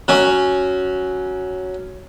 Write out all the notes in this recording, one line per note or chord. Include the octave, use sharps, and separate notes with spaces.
F#3 C#4